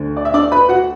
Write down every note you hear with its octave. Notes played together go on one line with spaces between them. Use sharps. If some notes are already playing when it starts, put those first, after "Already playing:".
Already playing: D2 D3
D5
E5
D4 D5
B4 B5
F#4 F#5